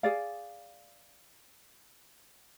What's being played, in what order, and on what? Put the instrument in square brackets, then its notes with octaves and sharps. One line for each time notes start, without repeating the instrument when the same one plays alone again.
[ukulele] G#4 D5 F5